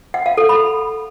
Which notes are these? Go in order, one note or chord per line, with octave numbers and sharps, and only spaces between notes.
F#5
F5
A4
B5